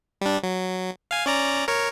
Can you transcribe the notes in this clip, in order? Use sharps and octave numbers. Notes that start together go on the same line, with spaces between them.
G3 D4
F#3
F5 G#5
C#4 D5 A#5
A#4 C#5